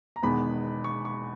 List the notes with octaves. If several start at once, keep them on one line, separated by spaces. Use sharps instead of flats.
A#5
E1 E2 D#3 G#3 B3 B5
C#6
C#6